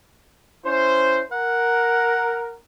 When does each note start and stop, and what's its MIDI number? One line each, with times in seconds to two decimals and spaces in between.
0.66 1.22 61
0.66 1.22 64
0.66 1.22 72
1.32 2.56 70
1.32 2.54 78